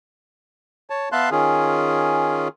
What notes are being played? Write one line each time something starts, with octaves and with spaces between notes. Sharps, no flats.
C#5 A5
B3 E5 F5 A5 C6 F#6
D#3 C#4 F4 G#4